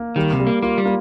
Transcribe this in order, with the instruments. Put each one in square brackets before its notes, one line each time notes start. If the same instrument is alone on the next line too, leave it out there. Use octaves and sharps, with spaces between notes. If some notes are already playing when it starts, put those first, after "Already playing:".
Already playing: [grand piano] A#3
[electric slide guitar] D#3 [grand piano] G3
[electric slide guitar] C3
[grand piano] G3
[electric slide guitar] A#3
[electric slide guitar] A#3 [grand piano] F4
[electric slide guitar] G3
[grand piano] A#3